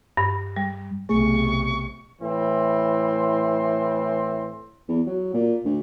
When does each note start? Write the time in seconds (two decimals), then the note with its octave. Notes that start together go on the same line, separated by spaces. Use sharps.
0.17 G2
0.56 G3
1.09 B1 C3 A3 G#4 C#6
2.22 A2 E3 C4 C6
4.89 E2
5.07 F#3
5.34 A#2
5.65 D2